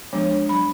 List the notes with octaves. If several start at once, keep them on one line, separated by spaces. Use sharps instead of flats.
F3 G#3 B3 D4
F#3 B5